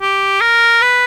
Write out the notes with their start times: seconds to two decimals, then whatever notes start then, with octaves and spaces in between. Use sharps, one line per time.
0.01 G4
0.41 A#4
0.82 B4